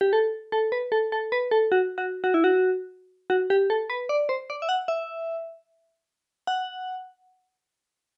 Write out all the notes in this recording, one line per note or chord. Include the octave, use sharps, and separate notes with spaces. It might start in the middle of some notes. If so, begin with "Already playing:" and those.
G4
A4
A4
B4
A4
A4
B4
A4
F#4
F#4
F#4
E4
F#4
F#4
G4
A4
B4
D5
C5
D5
E5
F#5
E5
F#5